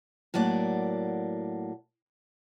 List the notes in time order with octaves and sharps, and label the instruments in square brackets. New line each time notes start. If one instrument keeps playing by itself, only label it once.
[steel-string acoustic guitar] A2 F#3 A#3 D5 F#5